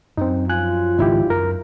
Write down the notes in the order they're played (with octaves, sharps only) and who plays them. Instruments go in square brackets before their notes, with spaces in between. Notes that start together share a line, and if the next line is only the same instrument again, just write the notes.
[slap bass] F#2 [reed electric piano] C4 D#4
[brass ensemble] F3 F#3 F4 [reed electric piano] G#5 F#6
[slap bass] G#1 C#2 D#3 [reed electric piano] D#4 E4 G4
[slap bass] F#2 [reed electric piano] A#4